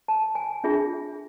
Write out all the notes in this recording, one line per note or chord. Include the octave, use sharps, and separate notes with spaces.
A5
G#5
D4 F4 G#4 E5